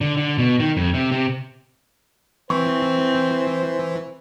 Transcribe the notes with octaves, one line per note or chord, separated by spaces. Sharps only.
D3
D3
B2
D#3
F2
C3
C3
E3 C4 C5 C#6